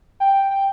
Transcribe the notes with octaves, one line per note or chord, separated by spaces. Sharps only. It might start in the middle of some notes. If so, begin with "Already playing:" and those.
G5
G5